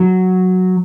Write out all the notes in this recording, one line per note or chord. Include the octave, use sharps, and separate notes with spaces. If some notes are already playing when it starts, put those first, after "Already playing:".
Already playing: F#3